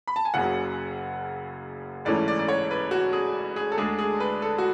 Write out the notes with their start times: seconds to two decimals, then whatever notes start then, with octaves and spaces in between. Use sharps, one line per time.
0.07 B5
0.16 A5
0.25 G#5
0.34 F#1 F#2 C#3 F#3 F#5
2.05 A1 G#2 E3 A3 C#4 D5
2.28 D5
2.39 D5
2.48 C#5
2.71 B4
2.91 F#4
3.13 G#4
3.56 G#4
3.72 A4
3.78 D2 D3 G#3 D4 G#4
3.99 G#4
4.20 B4
4.42 A4
4.58 F#4